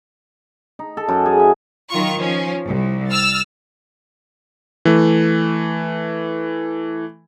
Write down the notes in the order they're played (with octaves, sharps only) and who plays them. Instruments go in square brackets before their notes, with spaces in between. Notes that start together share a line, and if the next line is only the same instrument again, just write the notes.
[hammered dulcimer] D#4
A4
F#2
G#4
E5
[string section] D#3 F#3 F4 C#6
F3 C#4
C2
E6 F6 A6
[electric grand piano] E3 A3